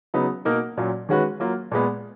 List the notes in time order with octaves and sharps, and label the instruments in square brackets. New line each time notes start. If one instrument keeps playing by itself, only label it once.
[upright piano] C#3 F#3 B3 D#4
B2 A#3 D#4 A#4
A#2 F#3 C#4 F4
D#3 G#3 C#4 F#4 B4
F#3 A#3 F4
A#2 G#3 B3